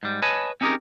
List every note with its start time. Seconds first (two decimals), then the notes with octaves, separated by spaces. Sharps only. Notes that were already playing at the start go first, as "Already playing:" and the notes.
0.03 G#2 G3
0.22 B4 C#5 D#5 G#5 A5 B5
0.61 C4 C#4 D#4 G4 G#4 A#4